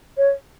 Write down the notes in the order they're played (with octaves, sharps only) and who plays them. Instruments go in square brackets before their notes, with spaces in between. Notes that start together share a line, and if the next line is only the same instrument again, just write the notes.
[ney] C#5